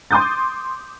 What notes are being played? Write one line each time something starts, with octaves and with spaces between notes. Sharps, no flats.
C6 D6 D#6 G6 A6